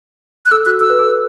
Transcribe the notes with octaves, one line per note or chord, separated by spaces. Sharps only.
F#6
A4 E6
F#4 F#6
A4 E6
B4
A4